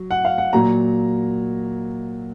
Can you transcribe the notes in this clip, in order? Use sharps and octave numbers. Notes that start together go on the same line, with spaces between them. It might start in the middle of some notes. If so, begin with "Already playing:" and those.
Already playing: F#3
F#5
F5
F#5
A#2 F#3 A#5